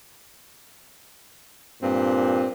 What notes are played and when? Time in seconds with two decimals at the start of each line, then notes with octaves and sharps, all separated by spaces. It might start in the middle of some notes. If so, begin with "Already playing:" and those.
1.81 G2 A#2 C4